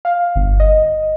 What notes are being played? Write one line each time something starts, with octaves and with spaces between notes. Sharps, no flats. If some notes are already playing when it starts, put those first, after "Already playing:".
F5
G1
D#5